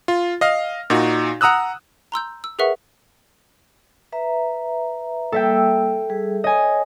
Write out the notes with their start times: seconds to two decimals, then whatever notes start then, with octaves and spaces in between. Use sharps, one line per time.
0.08 F4
0.41 D#5 F5 F6
0.90 A#2 D#4 F#4
1.41 F#5 A#5 D#6 E6 F#6
2.12 A#5 C6 E6 G6
2.44 E6
2.59 G#4 A#4 B4 E5 F#5 C#6
4.12 B4 E5 A#5
5.32 G3 A#3 A4 E5 G5 E6
6.10 G3 G#4
6.44 C#5 D#5 G#5